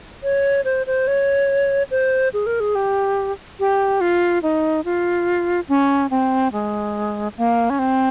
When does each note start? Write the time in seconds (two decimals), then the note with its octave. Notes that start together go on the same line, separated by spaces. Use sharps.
0.23 C#5
0.65 C5
0.87 C5
1.07 C#5
1.91 C5
2.34 G#4
2.46 A#4
2.60 G#4
2.75 G4
3.60 G4
4.01 F4
4.43 D#4
4.85 F4
5.69 C#4
6.10 C4
6.53 G#3
7.37 A#3
7.70 C#4
7.79 C4